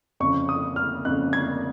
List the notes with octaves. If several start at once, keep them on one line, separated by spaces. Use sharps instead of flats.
F2 C#3 C#6
D#6
F6
F2 C#3 F#6
G#6